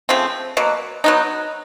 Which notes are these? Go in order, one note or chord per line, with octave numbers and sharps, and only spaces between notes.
C#3 F3 A3 C4
B2 F#3 A#3
F#3 B3 D#4